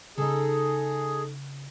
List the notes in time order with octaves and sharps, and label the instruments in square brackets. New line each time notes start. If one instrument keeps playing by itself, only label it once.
[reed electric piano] C#3 [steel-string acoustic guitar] D#4 A4 [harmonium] G#4